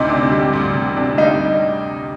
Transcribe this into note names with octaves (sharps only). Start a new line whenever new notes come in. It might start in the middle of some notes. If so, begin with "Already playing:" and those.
Already playing: D2 C3 D#4
D4
G3
D2
C3
D4
G3 D#4